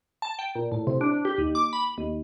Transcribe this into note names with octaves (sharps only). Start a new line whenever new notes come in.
A5
G5
A#2
A2
C3
D4
G4
D#2
D6
B5
D#2